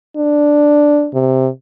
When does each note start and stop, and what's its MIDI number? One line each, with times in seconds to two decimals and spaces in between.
0.16 1.08 62
1.14 1.49 48